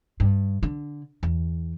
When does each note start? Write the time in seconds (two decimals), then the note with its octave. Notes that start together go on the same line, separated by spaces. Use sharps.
0.20 G2
0.63 D3
1.23 E2